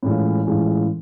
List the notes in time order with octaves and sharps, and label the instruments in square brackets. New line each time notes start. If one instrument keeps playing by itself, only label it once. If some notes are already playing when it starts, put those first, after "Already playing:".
[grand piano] A2 E3 G#3 C#4 F4
A2 E3 G#3 C#4 F4